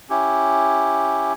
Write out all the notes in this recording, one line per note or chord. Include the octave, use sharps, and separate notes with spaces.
C#4 E4 G4